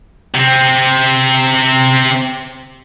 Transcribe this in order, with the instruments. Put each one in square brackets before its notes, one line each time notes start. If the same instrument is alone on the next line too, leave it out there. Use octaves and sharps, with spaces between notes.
[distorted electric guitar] C3 C4